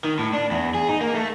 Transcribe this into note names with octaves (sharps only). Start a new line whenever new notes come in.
D#3
A2
D4
E2
G#4
D#4
A#3
A3